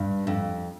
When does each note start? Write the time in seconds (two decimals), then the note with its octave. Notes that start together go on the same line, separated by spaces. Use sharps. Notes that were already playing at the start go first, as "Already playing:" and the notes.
Already playing: G2
0.27 F2